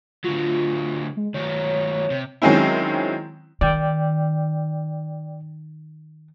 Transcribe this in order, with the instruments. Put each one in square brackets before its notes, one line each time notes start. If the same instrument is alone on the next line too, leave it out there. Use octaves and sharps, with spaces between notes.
[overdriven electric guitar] D3 F#3 [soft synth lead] F4
[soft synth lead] G#3
[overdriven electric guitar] D#3 F#3 [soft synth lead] C#5
[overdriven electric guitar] C3
[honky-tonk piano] D#3 F#3 G#3 C4 C#4 E4
[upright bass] D#3 [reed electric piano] D5 G5